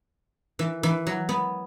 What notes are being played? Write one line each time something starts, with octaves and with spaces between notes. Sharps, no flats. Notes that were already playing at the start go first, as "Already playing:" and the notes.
E3
E3
F#3
B3